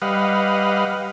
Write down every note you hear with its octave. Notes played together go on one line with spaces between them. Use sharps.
G3 B4 D#5 F5 F#5